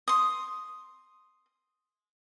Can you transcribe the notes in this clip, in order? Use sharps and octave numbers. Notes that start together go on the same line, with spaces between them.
C6 D#6